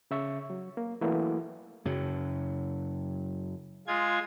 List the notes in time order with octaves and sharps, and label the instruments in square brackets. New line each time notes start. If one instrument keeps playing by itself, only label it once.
[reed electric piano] C#3 E5 C#6
F#3
A#3
E3 F#3 A3 A#3 E4 F#4
[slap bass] F#2 C#3 F#3
[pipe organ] G#3 F4 G#6